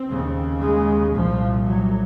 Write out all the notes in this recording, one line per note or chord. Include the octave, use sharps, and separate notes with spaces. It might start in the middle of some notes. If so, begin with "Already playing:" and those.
Already playing: C4
D#2 C#3
G#3
C2 A#2 F3
F#3